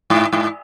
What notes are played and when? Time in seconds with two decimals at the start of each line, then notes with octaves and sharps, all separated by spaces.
0.10 G#2
0.33 G#2